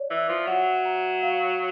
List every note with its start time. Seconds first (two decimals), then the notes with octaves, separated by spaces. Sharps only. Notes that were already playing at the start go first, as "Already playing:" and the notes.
Already playing: C#5 D5
0.10 E3 E5
0.29 F3
0.47 F#3 F#5
0.85 A#5
1.23 F5